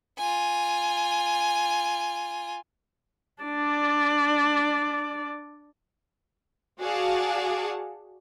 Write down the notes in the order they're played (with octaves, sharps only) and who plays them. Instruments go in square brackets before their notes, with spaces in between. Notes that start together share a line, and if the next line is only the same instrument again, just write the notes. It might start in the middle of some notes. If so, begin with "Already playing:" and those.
[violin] F4 G#5
[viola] D4 D5
[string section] F#4 G#4 D5 F5 F#5 A5